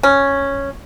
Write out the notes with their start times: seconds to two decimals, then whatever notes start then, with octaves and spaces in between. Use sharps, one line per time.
0.03 C#4